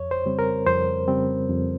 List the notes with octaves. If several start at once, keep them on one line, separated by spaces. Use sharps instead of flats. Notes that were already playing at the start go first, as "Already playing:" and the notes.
Already playing: F2 C#5
C5
C#3 G3 C4
A#4
F2 C5
C#3 G3 C4
F2